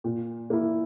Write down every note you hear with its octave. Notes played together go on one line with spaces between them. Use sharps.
A#2
A#3 E4